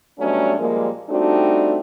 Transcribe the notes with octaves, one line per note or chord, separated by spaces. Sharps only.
B2 F#3 G3 A3 C#4 D4
A#2 F3 G3 G#3 A#3
G3 A3 C4 D4 D#4 F#4